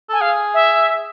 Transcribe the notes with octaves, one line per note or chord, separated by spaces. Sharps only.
A4 G#5
G#4 F5
E5